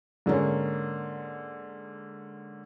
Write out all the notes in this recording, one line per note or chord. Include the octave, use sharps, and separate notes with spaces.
G#2 D3 A#3 C#4